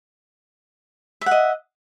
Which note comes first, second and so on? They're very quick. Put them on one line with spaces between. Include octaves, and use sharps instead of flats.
E5 F#5 D#5